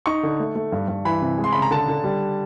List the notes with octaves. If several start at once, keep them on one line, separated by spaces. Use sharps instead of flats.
D#4 C#6
D3
A3
A3
G2
G2
E3 B5
C3
G#3
C6
C#3 B5
A#5
D3 A5
D3
G3